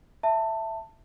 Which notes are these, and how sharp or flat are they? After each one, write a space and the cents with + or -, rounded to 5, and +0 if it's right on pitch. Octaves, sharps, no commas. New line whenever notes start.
E5 +0 A5 +20